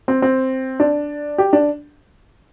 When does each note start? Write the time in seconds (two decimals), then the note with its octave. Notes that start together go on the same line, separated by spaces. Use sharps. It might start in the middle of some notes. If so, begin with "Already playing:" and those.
0.08 C4
0.22 C4
0.80 D4
1.38 G4
1.53 D4